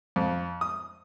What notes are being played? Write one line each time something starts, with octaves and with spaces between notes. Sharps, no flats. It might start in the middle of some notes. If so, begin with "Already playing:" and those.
F2
D#6